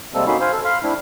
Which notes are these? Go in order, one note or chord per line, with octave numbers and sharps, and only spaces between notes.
C3 G3 G#3 A#3 C4 A4
A#3 C#4 D#4 F#4 B5 C6
C5 F5 G#5
A4
F5 B5 C6 F6
A3 C4 D4 E4